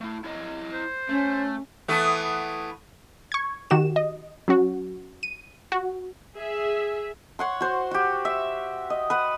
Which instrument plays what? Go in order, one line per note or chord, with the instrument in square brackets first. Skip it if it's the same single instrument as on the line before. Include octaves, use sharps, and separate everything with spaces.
[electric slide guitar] A3 E4
E4 C#5 D#5
[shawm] C5
[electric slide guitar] A3 [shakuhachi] C#4
[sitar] E3 A3 B3
[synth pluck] C#6 G#6
D#3 F#4 G4 E7
D#5
F#3 C#4 F#4
D#7
F#4
[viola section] G#4 E5
[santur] C#5 F#5 C6
F#4 C5
F#4 G4
E5
D#5
B4 F#5